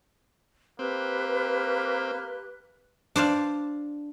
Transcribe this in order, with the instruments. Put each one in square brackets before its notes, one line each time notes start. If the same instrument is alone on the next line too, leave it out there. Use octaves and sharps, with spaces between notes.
[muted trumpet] A#3 [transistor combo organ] C4 [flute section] G4 B4 F#6
[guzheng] D4 C5 D5 F5